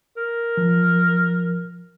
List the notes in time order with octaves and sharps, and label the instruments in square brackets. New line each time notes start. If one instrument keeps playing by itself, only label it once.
[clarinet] A#4
[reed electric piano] F3